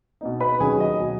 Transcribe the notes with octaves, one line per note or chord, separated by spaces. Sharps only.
B2 B3 D#4
B4 B5
D#2 D#3 F#3 C#4 G#4 G#5
D#5
B2 F#3